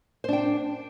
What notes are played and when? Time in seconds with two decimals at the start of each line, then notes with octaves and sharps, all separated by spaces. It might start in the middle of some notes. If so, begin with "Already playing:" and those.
0.24 C5
0.28 D4
0.33 G5